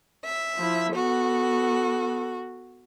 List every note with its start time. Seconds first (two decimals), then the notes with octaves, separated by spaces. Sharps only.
0.25 E5
0.57 F3 E4
0.95 B3 F#4 A4